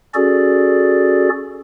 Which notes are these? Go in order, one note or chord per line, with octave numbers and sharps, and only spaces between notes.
C#4 F#4 G#4 A4 D5